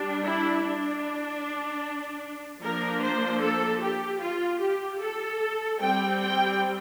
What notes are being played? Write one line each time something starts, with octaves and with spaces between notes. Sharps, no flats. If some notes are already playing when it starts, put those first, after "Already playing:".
Already playing: G3 D4
E4
D4
F3 A#3 D4 A#4
C5
A4
G4
F4
G4
A4
G3 C4 G5
G5